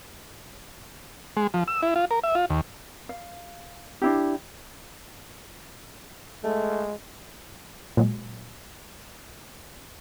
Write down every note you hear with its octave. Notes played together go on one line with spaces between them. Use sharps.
G#3
F3
E6
E4
F4
A#4
E5
F4
D#2
F5
D4 E4 G4
G#3 A3
A#2 F#3 G#3